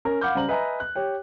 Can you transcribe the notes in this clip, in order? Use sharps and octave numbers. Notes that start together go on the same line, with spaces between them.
C#4 A#4
F5 F#5 B5 D6 F6 G6
C#3 G3 C5 A#5 F#7
B4 D#5 E5 G#5 A#5
F#6
G4 C#5 G5